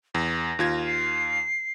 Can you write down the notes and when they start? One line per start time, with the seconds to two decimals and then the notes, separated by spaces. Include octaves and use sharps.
0.15 E2 A#6
0.59 D#2 F4 G#6
0.86 C7